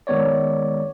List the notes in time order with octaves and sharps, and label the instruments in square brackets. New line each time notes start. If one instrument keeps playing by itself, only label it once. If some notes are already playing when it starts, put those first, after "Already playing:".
[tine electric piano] D#3 G#3 B3 C#5 D5